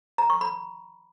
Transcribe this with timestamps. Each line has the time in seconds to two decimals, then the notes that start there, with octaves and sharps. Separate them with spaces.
0.18 A#5
0.30 C#6
0.41 B5